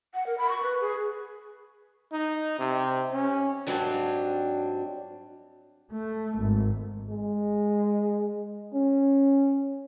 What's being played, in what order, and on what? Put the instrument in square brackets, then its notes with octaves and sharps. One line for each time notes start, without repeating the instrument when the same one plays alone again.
[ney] F#5
A#4
B5
C#6
B4
G#4
[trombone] D#4
C3
C#4
[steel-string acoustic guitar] G#2 F#3 G3 C4 D4
[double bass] A3
G#1
[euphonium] G#3
C#4